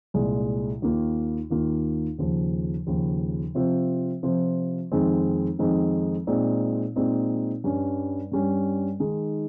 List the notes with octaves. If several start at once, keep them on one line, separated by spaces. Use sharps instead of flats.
C2 A#2 G#3
D#2 D#3 A#3 F4
D#2 D#3 A#3 F4
D#2 C#3 F3
D#2 C#3 F3
C3 F3 C4 F4 C5
C3 F3 C4 F4 C5
F2 D#3 G#3 C4 D#4
F2 D#3 G#3 C4 D#4
A#2 G#3 C4 D#4
A#2 G#3 C4 D#4
G2 G3 C#4
G2 G3 C#4
D#3 G#3 D#4 G#4